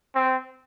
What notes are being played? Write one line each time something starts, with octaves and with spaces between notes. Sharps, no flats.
C4